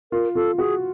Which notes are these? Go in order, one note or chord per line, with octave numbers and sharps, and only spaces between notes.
F4 A#4
F4 A4
F#4 G#4